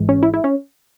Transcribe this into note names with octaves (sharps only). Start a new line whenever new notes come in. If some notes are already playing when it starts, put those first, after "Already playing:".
Already playing: G#1 G#2 E3 G#3
C#4
E4
E4
C#4